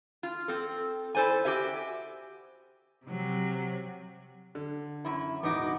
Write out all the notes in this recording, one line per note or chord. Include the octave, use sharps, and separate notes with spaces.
F4
C4 A4
E4 A4 C5 D5 G#5
F#4 G4 A4 C#5 E5 G#5
C3 F#3
D3
F#2 E4
E1 A1 B3 D#4 F#4 D6